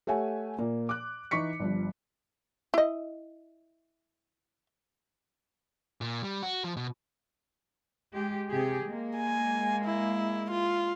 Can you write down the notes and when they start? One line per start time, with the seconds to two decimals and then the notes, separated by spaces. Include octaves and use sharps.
0.07 A3 G4 C#5 E5 F#5 G#5
0.58 A#2 A#3
0.89 D6 F#6
1.31 E3 D#4 C#6 B6 C#7
1.60 G1 G2 F3
2.74 E4 D#5
6.01 A#2
6.22 G3
6.42 F#4
6.64 F3
6.77 B2
8.13 G#3 G4
8.48 C3 G4 G#4
8.85 G#3 A#3
9.17 G#5
9.86 E4
10.51 F4